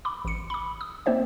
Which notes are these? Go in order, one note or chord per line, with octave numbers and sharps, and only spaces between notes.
B5 D6
A1 C#7
B5 D6
D#6
A#3 C4 C5 E5